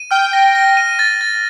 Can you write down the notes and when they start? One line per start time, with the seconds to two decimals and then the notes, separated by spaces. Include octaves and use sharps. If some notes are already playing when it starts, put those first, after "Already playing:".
Already playing: D#7
0.11 G5 F6
0.33 A#6
0.55 A#6
0.77 D#7
0.99 A6
1.21 A6